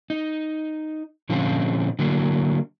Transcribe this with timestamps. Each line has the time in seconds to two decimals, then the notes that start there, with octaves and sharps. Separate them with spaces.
0.10 D#4
1.29 A#2 D3 F3 C4 C#4 F4
1.99 D3 F#3 A#3